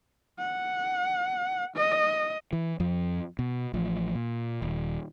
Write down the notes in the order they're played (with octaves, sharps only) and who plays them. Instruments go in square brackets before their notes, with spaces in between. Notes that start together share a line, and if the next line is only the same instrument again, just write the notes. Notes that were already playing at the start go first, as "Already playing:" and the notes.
[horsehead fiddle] F#5
D#5
[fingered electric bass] E3
F2 F3
B2
A1 F3
A#2
D#1